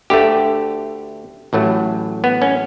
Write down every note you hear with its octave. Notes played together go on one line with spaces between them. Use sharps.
D2 D3 A3 G4
A1 A2 F#3 A3
B3
C#4